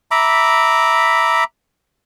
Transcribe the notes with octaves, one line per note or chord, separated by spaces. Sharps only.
E5 A#5 B5 D6